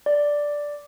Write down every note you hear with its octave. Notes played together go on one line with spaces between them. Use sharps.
D5